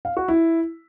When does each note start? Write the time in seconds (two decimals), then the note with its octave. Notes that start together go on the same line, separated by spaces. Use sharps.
0.05 F5
0.17 F#4
0.28 E4